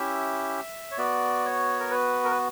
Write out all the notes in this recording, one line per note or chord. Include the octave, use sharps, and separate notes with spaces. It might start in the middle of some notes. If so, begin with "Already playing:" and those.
Already playing: C#4 E4 G4 E5
C#5
B3 F#4 D5
C#5
A#4
B4
A#4
B4